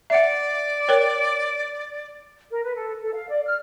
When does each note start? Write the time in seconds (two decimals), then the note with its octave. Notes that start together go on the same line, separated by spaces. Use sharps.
0.10 D5 E5 F#5
0.88 A#4 C#5 G5
2.51 A#4
2.63 B4
2.75 A4
3.02 A4
3.13 F5
3.29 D5
3.46 F6